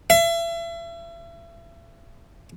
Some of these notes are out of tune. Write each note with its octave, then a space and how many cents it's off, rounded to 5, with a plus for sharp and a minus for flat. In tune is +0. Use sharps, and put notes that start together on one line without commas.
E5 +35